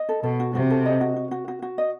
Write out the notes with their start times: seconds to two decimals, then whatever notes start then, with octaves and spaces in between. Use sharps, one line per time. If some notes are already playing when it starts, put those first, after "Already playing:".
Already playing: D#5
0.09 A4
0.23 B2 A4
0.40 F#4
0.55 C3 F#4
0.70 A4
0.86 D#5
1.01 F#4
1.16 F#4
1.31 F#4
1.48 F#4
1.62 F#4
1.78 D#5